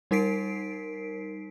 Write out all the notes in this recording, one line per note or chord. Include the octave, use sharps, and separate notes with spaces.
G3 D#4 A#4 B6 C7 D7